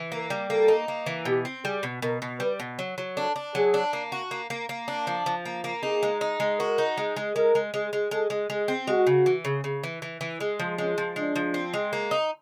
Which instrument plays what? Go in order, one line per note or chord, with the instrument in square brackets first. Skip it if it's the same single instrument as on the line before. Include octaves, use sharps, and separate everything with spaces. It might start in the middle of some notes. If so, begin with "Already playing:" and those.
Already playing: [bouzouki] E3
[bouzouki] A#3 [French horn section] A#4
[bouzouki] G3
[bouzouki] A#3 [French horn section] A4
[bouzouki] D#4
A#3
E3
[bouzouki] B2 [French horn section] G4
[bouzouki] C4
[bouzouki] G3 [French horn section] G#4
[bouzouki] B2
[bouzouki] B2 [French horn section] A#4
[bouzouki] B2
[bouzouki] G3 [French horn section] B4
[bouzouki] B2
F#3
F#3
[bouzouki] D4 [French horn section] A4
[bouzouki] D4
[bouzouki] F#3 [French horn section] G#4
[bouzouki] D4
A#3
F#4
A#3
A#3
A#3
D4
F3
F3
A#3
A#3
[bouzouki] D#4 [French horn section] G#4
[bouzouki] G#3
D#4
G#3
[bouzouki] F#4 [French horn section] A#4
[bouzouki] D#4
G#3
G#3
[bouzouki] G#3 [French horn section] A#4
[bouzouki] G#3
G#3
G#3
[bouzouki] G#3 [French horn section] A4
[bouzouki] G#3
[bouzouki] G#3 [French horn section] G#4
[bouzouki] C4
[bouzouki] G#3 [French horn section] F#4
[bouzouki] C#3
E3
C#3
C#3
E3
E3
E3
G#3
F3
[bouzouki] G#3 [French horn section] C#4
[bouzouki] F3
[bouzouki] G#3 [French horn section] D4
[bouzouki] F3
C4
G#3
A#3
D#4